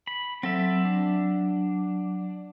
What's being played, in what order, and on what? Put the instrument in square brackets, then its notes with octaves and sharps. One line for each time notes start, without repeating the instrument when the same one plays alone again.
[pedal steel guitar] B5
[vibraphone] F#3 [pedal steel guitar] C4 A4 E5
[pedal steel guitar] D4